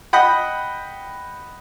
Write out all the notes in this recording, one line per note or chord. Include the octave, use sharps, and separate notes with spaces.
D#5 F#5 G5 B5